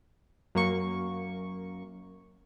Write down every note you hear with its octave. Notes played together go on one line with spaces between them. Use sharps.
F#2 A#3 C#6